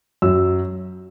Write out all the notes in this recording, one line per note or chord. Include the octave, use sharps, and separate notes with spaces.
F#2 F#3 E6